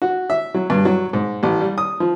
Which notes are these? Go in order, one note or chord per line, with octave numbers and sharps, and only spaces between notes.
F#4
E5
F#3
G2
F#3
G#2
A1
G3
D#6
F3